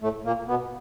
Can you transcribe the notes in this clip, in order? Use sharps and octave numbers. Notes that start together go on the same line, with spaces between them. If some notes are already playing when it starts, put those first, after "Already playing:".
A2 A3
A#2 A#3
B2 B3